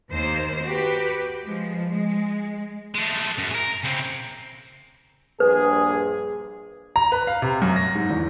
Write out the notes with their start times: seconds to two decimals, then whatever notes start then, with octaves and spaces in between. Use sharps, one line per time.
0.10 D#2 A#3 C5
0.64 F#4 G4 B4
1.43 F3 G#3
1.88 G#3
2.94 G#3 A3
3.38 F#2
3.51 G#4 A#4
3.84 C#3 C4
5.40 A#1 G2 G#4 B4
6.96 A#5
7.12 B4
7.27 F5
7.42 C3
7.62 F#2
7.76 A#6
7.95 G#2
8.10 E2